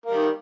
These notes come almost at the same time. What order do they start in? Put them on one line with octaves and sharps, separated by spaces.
A#3 G3 D#3